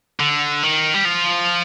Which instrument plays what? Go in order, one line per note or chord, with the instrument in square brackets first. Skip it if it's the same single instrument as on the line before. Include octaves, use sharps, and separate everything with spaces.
[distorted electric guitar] D3
D#3
G3
F3